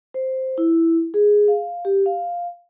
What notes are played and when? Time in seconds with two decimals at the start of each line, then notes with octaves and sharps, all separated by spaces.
0.14 C5
0.58 E4
1.14 G#4
1.48 F5
1.85 G4
2.06 F5